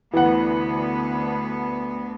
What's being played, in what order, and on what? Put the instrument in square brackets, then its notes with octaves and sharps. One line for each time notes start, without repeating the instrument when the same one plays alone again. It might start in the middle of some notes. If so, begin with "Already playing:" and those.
[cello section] D2 B3 [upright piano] E3 F#5